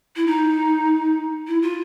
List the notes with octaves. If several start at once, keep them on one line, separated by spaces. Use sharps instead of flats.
E4
D#4
E4
F4